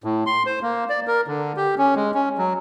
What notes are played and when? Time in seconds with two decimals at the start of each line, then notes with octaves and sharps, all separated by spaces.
0.04 A2
0.26 C6
0.46 C5
0.62 A#3
0.90 D5
1.07 A#4
1.27 D3
1.57 G4
1.78 C#4
1.96 G#3
2.14 C#4
2.38 F#3